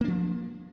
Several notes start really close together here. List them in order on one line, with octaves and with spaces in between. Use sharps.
A#3 D4 F3